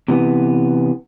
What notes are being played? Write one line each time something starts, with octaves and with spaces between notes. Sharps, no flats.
C3 E3 B3